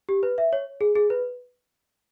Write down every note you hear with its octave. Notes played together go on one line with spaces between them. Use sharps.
G4
B4
E5
C#5
G#4
G#4
B4